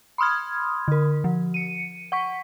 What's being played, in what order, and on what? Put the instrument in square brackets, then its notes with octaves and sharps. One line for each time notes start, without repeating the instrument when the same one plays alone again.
[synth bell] B5 C6 D#6 F6 G#6
D3 A#4
F3
C#7 D#7
F#5 C#6 B6